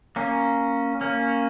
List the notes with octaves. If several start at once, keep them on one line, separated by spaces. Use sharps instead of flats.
A#3 C#4
A#3 C#4